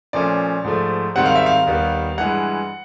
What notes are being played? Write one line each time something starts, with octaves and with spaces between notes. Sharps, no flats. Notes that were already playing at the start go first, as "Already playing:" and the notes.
A#2 F3 A3 C#4 D5
G#2 F3 A3
G#2 D#3 G3 C4 F#5
F5
E5
F5
D#2 D#3 G3 B3
G2 E3 G#3 F#5